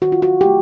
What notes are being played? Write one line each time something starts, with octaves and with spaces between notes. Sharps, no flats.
D#3 F#4
F4
F#4
F#3 A3 G4